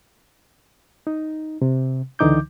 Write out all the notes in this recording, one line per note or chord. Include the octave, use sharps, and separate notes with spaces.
D#4
C3
C#2 D3 E3 D#4 D6 G6